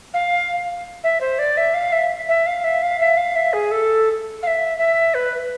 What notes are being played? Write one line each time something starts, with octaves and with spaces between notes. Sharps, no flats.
F5
E5
C5
D5
E5
F5
E5
E5
F5
E5
F5
E5
F5
E5
G#4
A4
F5
E5
E5
B4